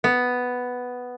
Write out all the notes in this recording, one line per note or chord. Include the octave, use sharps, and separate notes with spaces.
B3